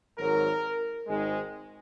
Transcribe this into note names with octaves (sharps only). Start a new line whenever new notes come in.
G#1 G#2 F#3 A#4
G#1 G#2 D#3 G#3